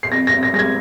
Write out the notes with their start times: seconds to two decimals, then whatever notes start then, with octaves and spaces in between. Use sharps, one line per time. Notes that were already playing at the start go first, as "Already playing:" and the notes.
0.03 C7
0.12 F2 A#6
0.27 A#6
0.32 F2
0.43 A#6
0.53 G#3 A#6
0.59 G#6